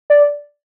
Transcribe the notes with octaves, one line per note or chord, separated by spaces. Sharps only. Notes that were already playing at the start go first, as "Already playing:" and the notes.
D5